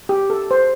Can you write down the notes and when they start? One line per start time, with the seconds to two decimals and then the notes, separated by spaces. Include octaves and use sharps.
0.09 G4
0.30 A4
0.51 C5